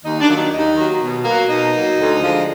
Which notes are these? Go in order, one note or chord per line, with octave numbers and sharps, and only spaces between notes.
D#2 D#4
D4
D#3 F#3 A#3
D#4
D#2 D#4
D#3 F#3 A#3
B2
F#3 A#3
B2 D#4
F#3 A#3
D2
D3 F3 G#3